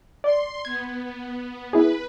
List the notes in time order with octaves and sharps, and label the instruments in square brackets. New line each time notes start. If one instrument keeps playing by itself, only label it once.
[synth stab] D5 [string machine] C6
[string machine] B3 [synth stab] G#6
[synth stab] B3 E4 G#4 [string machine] B4